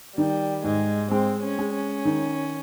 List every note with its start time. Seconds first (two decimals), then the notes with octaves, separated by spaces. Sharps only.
0.17 D#3 G3
0.64 G#2 G#3
1.11 G#3 C4
1.43 C#4
1.59 G#3
1.75 C#4
2.05 D#3